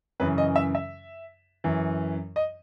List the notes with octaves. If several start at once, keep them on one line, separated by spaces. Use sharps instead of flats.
F#2 C#3 E3 B4
D#5
E5
E5
F#2 E3
D#5